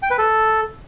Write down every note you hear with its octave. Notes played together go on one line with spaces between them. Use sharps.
G5
B4
A4